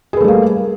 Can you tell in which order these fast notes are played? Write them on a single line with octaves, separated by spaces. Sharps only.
G#4 B4 A3 G3 A#3